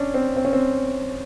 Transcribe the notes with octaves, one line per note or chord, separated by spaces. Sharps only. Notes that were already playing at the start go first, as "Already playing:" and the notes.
Already playing: C#4 D4
C4
C4
C#4
C4